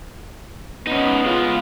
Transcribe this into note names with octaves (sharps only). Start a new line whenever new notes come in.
B3 C#4 D#4
G#3 F4